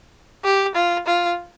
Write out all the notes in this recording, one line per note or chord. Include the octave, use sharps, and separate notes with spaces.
G4
F4
F4